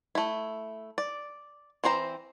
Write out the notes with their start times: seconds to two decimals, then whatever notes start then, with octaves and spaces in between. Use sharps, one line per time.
0.15 A3 E4
0.98 D5
1.84 E3 C4 C5 A#5